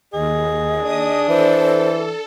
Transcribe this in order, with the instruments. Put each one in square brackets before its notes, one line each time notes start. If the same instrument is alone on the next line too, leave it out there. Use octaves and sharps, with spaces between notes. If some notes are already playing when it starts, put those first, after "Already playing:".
[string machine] D#2 [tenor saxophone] G#4 [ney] D#5
[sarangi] D4 [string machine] D#6
[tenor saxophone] E3 [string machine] A4 [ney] C5